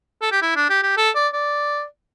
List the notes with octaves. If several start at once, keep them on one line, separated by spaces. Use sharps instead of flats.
A4
G4
E4
D4
G4
G4
A4
D5
D5